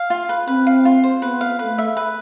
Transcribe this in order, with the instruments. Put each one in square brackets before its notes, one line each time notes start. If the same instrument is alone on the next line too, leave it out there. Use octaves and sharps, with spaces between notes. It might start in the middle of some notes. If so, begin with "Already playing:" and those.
Already playing: [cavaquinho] F5
F4
B4
[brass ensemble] C4 [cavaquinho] B4
[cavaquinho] F5
F4
C5
[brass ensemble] B3 [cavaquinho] B4
[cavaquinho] F5
[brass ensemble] A3 [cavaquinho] B4
[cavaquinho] E5
B4